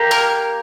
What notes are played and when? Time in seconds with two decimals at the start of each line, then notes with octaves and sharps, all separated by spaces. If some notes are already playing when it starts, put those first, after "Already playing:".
Already playing: A#3 G4
0.11 A#4